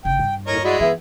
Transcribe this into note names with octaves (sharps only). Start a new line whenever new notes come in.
G1 C#3 G5
G2
D#2 A2 A#4 C#5 D#5
G#3 E4 F#4 D5 D#5
E3 B3 G#4 E5